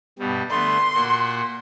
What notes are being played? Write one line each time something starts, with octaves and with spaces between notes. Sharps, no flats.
G2 B2 G3
D3 A3 B3 C6
A#2 F#4